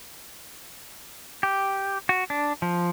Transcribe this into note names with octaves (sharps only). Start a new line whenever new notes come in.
G4
F#4
D4
F3